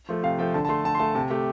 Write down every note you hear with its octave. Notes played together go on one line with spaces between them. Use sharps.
F3 A3
C3 F5
F3 A3 G5
D3 A5
A5
A3 C6
D3 A5
C6
A3 A5
C3 A5
A3 G4